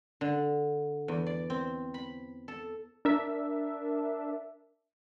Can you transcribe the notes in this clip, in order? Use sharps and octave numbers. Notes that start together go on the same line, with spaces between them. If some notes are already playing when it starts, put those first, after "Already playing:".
D3
E2
D5
C4
B5
A4
D4 A#4 E5